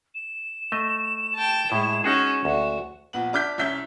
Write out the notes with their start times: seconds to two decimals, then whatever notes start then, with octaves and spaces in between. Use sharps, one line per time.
0.15 E7
0.72 A3 D#5
1.35 G5 A5
1.72 A2 G#3 E4
2.04 C#4 D#4 F#4 G#4
2.45 D2 F#4
3.13 A#1 B3 F#7
3.33 D4 D6 F6 G6 B6
3.58 C2 C#4 E5 G6 B6 G7